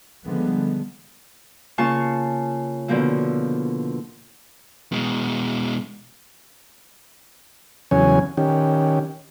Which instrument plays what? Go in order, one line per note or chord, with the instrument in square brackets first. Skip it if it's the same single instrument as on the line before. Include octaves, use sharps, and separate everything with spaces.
[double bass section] D3 F3 G3 G#3 B3
[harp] C#3 A#3 F4 F5 A5 C#6
B2 D3 F3 A#3 E4
[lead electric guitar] B2 G#3
[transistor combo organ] E2 C#3 F#3 C#4 C#5 G#5
D#3 C#4 G4